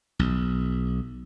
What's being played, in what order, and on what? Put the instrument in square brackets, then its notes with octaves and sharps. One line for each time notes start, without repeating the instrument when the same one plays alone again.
[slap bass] B1